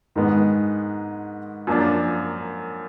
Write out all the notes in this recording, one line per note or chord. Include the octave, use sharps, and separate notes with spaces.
G#2 D#3 G#3 B3
F#2 F3 A#3 D4 F4